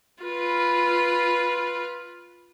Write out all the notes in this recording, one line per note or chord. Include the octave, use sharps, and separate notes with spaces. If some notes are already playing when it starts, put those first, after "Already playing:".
F4 B4